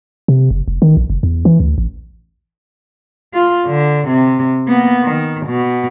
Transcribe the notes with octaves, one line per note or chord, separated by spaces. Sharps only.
C3
F#1
F1
D#3
A#1
F#1
E2
E3
D2
A1
F4
D3
C3
A#3 B3
D#3
B2